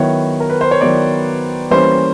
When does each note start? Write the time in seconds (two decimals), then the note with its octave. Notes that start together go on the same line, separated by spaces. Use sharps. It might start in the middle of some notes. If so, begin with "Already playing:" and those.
Already playing: D#3 F#3 B3 E4 C#5
0.40 A#4
0.50 B4
0.61 C5
0.71 C#5
0.81 D#3 F#3 B3 E4 D5
1.71 E3 G3 A#3 C#4 C5